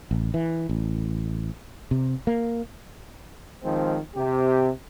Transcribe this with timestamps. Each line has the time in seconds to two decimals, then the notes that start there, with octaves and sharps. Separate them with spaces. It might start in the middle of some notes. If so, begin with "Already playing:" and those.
0.11 A1
0.34 E3
0.69 A1
1.91 C3
2.27 A#3
3.63 D#3 F3 G#3 C4
4.15 C3 G4